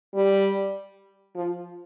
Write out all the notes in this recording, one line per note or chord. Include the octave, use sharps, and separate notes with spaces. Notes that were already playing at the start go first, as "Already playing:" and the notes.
G3
F3